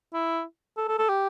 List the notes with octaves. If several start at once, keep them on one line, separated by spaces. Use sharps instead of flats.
E4
A4
A4
A4
G4